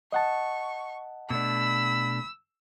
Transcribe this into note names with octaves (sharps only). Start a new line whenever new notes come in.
D#5 F#5 A5 C#6
B2 A3 D4 B5 E6